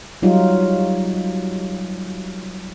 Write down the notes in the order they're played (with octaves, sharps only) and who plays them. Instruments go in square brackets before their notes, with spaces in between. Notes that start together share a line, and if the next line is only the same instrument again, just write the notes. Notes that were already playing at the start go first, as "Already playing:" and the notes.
[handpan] F#3 G3 D#4 F4